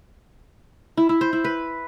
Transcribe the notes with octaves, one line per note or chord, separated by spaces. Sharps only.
E4
E4
C5
E4
B4